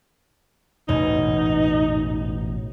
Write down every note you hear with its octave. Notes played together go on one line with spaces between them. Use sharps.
A1 E2 G#2 B2 D#4